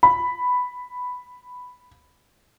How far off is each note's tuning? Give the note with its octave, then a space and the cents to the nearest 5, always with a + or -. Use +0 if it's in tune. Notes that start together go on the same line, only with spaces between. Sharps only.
B5 +5